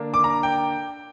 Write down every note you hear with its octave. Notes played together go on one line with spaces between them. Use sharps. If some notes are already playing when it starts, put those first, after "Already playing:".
Already playing: D3 A#3 D4
D6
A#5
G5